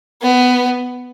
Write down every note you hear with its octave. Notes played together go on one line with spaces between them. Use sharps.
B3